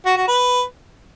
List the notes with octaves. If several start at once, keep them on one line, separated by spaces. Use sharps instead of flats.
F#4
F#4
B4